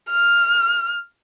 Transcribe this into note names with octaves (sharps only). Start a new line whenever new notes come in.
F6